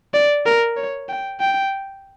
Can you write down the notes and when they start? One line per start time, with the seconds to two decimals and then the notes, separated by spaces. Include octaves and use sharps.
0.14 D5
0.45 A#4
0.77 C#5
1.09 G5
1.40 G5